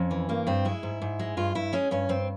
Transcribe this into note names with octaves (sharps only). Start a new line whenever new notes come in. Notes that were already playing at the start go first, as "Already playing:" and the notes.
Already playing: F2 C#4
E3
G2 A#3
G2 C4
G#3 E4
G#2
G#2
G#3
G2 F4
G2 E4
G#3 C#4
G2 C#4
G2 C4